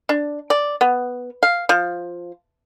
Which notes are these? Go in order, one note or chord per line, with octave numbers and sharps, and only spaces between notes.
D4
D5
B3
F5
F3